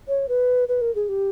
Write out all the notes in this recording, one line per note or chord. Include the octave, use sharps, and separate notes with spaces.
C#5
B4
B4
A#4
G#4
G4